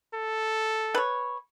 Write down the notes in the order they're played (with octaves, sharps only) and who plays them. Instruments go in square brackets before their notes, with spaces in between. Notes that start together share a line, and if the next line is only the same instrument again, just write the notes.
[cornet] A4
[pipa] B4 C#5